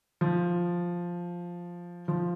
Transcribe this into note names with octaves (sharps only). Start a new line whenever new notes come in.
F3
F3